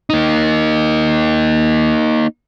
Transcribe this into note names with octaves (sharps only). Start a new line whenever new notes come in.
A#3 D#4